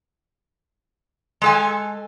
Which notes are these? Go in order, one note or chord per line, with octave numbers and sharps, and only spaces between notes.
G#3 A4 G#5